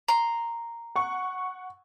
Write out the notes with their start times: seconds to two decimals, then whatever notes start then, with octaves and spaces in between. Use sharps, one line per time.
0.08 A#5 C6
0.96 F#5 C#6